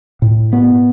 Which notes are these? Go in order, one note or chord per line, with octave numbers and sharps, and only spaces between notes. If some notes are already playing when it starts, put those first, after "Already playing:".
A2
B3